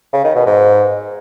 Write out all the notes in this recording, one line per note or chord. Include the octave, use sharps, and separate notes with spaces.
C#3
D#3
B2
G#2